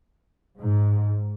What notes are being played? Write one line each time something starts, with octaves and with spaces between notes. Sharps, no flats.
G#2